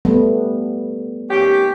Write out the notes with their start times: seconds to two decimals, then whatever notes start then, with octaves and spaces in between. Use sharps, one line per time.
0.05 G3 A3 B3
1.30 D#2 C#4 G4